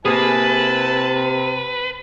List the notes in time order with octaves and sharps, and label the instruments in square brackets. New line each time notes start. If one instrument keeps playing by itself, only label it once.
[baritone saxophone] C3 [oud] A#3 G#4 [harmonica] E4 A5 [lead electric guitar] B4